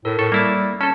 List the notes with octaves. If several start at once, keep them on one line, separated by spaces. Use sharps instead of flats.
A2 A4 A#4
A2 A4 C#6
G3 A#3 E4 A5
C#4 A4 A5